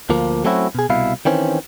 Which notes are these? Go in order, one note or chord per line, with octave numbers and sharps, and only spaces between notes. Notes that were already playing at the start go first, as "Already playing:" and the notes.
D2 F3 A#3
F#3 A3 C4 C#4 E4 F#4
B2 G#4
C2 B2 E4 F5
D#3 E3 C4 C#4